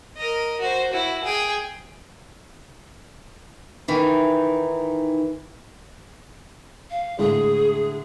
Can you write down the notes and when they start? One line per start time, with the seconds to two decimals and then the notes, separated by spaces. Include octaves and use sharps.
0.17 A#4 D#5
0.60 F#4 C5
0.91 E4 F#4
1.24 G#4 G5
3.88 D#3 E3 D#4
6.90 F5
7.19 A2 D3 G#3 G#4